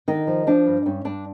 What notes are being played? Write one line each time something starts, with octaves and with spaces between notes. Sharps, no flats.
D3 D#3 D#4
F3
F3 D4
G2
G2 C#4
G2 D4